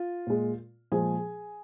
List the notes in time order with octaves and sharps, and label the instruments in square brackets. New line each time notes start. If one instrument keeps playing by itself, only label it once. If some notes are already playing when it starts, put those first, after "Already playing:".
Already playing: [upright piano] F4
A#2 G#3
A#2 F3 G#3 G#4 G#5